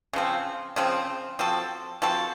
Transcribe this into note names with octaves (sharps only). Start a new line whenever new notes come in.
C#3 F3 C4
C#3 F3 C4
F3 C4 F#4 A4
F3 C4 F#4 A4